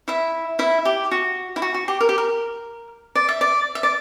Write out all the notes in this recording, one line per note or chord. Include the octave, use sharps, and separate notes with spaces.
E4 E5
E4 E5
G4
F#4
E4
F#4
F#4
G4
A#4
G4
A#4
D5
E5
D5
E5
D5